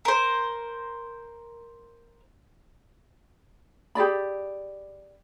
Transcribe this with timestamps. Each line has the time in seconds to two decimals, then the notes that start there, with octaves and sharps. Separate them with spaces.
0.05 A#4 C5
3.95 G4 G#4 D5 B5